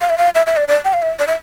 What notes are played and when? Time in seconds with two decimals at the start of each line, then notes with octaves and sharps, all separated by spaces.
0.01 F5
0.10 E5
0.18 F5
0.35 E5
0.47 E5
0.57 D5
0.68 D5
0.85 G5
0.93 F5
1.02 E5
1.19 D5
1.27 E5